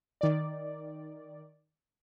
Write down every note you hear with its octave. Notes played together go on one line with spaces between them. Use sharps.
D#3 D5